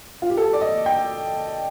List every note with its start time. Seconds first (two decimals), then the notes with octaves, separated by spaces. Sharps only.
0.22 F4
0.30 G4
0.37 A4
0.53 D5
0.61 D#5
0.86 G5